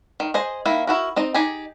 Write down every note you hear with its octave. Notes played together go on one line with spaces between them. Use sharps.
D#3
G#4 C5 D#5
D#3 A#3 E4
E4 F#4 A#4
C4 D#4 D#5
D#4 G4 G#4 G#5